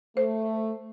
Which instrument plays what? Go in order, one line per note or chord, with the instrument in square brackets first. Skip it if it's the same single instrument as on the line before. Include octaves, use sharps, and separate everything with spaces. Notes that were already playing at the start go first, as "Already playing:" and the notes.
[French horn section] A3 [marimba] C5